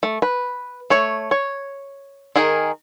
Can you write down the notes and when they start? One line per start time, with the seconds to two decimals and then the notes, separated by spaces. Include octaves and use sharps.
0.03 A3
0.22 B4
0.90 A3 C#5
1.31 C#5
2.36 D#3 G#4 A#4